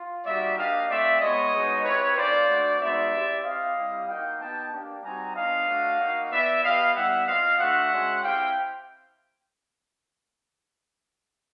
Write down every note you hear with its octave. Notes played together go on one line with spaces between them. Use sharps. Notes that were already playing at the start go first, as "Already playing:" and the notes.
Already playing: F4
G3 A#3 D#4 F#4 D5 E5
A#3 D4 G4 D#5 F5
A3 C4 F4 D5 E5
G#3 B3 E4 C#5 D#5
G#3 B3 D#4 F#4
C4 E4 G4 B4 C#5
A#3 C#4 F4 C5 D5
A3 D4 F#4
G#3 B3 D#4 F#4 D5 E5
C4 E4 G4
C4 E4 G4 D#5 F5
G3 C4 E4 G4
A#3 D#4 F#4 F5 G5
B3 D#4 G4 G5 A5
A#3 D4 G4
G3 C4 D#4 F#4 G#5 A#5
B3 D4 F4 D#5 F5
A3 D4 F#4
A#3 D#4 F#4
B3 E4 G4 D5 E5
B3 E4 G4 D#5 F5
G3 B3 E4 E5 F#5
C4 F4 D#5 F5
A3 D4 F#4 E5 F#5
G#3 C#4 F#4
C4 E4 G4 F5 G5